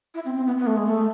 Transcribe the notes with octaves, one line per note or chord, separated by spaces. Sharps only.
E4
C4
C4
B3
B3
A3
G#3
A3